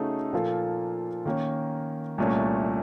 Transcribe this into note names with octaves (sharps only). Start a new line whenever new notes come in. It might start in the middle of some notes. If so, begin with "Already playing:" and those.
Already playing: C#3 A3 D#4 F#4 A4
A#2 F3 A#3 F4 A4
D#3 A#3 C#4
C2 A#2 A3 C#4